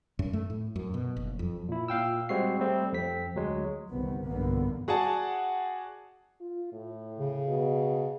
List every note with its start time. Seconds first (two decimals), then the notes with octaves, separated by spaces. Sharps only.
0.19 F#2
0.33 A3
0.50 A2
0.76 F#2
0.94 B2
1.17 F#1
1.39 F2
1.68 A#2 E4
1.88 A#2 F5 G5 E6
2.29 G3 G#3 C4 F#4 C7
2.60 G3 A3 C4
2.93 F2 C4 B6
3.35 D2 F#3 G#3
3.90 G1 C2 C3 D#3 B3
4.25 B1 G2 D3 E3 A#3 B3
4.88 F#4 G#4 D5 F#5 A5
6.41 F4
6.72 A2
7.18 C#3
7.48 B2